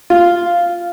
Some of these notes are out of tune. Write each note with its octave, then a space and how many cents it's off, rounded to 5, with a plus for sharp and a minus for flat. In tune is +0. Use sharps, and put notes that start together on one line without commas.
F4 -5